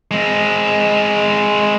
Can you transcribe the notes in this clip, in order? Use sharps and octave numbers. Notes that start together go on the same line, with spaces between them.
G#3 C4